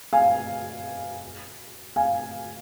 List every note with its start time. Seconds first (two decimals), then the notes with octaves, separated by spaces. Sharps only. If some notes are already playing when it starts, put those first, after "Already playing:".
0.13 F5 G#5
1.96 F5 G#5